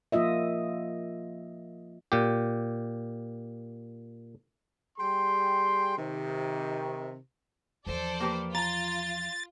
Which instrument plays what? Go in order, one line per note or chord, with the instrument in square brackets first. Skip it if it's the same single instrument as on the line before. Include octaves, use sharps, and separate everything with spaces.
[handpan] F3 A#3 F4 D#5 E5
[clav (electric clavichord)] A#2 G4
[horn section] G3 G#4 G5 C6
C3 D#3
[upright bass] E2 F3 [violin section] A4 C5 D5
[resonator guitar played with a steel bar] A#3 G4 B4
[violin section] F4 [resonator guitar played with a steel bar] A#5 [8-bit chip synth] A6